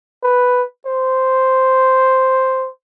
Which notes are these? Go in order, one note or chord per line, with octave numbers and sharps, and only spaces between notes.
B4
C5